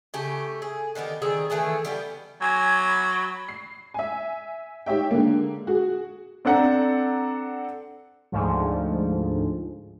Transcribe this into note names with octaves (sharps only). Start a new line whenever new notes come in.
C#3 A3 G4
G#4
D3 D#3 B3 G4
D#3 G3 C4 G#4
D#3 E3 A3 G#4
G3 B3 G4
F#3 G#5
B5
C7
E5 G#5
D#4 G4 C#5 E5 G5
D3 G#3 A#3
F#4 G#4
C4 D4 A4 F#5 A#5
D2 G#2 F3